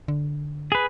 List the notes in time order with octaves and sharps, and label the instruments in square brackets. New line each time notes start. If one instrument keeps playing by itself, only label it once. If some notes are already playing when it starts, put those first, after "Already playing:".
[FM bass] D3
[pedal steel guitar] G#4 B4